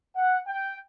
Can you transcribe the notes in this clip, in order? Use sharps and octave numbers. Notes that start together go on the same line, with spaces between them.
F#5
G5